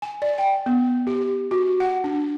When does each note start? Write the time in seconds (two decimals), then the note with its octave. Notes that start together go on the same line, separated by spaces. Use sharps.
0.02 G#5
0.22 D5
0.38 G5
0.66 B3
1.07 G4
1.51 F#4
1.80 F#5
2.04 D4